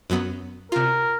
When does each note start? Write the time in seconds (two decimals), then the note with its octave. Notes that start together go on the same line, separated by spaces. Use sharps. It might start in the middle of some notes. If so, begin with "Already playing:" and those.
0.10 F#2 F#3 B3
0.72 C3 F4 A#4